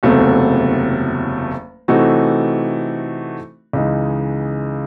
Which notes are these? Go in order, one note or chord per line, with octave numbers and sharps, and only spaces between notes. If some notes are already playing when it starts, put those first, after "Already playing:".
F#1 E2 C3 F#3 A3
C3 E3 A3 D#4 F#4
C#2 C#3 E3 G#3 D#4